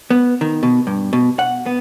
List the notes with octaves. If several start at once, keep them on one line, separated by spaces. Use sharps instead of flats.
B3
D#3
B2
G2
B2
F#5
B3